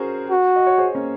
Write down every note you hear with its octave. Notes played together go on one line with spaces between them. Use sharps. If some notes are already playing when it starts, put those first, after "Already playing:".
Already playing: C#4 F#4 G#4 A#4 C5
F#4
D#5
C#5
G#4 C5
A#3 C#4